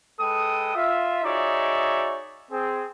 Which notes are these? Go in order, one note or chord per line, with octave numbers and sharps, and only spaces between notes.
G#3 A4 B4 G5 D#6
F4 E5
D#4 F#4 G#4 C#5 D5 E5
C4 G#4